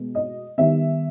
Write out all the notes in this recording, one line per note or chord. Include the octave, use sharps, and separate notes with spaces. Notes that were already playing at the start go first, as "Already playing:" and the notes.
Already playing: B2 G#3 B3
D#5
D#3 G3 B3 E5